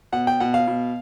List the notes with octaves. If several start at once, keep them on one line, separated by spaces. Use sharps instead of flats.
B2 F#5
G5
B2 F#5
F5
B2